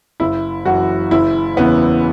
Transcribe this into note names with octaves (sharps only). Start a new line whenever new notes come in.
F#1 E4
F#2 E3 F#4
F#1 E4
E2 C#3 E3 B3